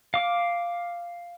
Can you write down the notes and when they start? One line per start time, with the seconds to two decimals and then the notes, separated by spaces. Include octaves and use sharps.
0.14 F5 D6